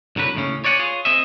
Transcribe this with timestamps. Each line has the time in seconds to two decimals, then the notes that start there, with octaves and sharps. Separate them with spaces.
0.16 C2 D3 F#3 B4
0.35 D#2 A2 C#3 C#4
0.64 C#5 D5 F#5 G#5
0.79 F4 G#4 C#5
1.05 C4 G#4 D#5 E5